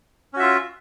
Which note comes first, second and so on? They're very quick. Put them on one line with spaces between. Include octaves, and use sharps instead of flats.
C#4 F#4 E5 F4